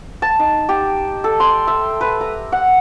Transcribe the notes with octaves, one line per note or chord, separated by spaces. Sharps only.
A5
D#4
G4
A4
C6
E5
B4
A#5
F#5